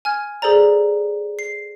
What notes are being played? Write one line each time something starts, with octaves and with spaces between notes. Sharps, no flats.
G#5 F6 G#6
G#4 A4 C5 D5 A#5
C7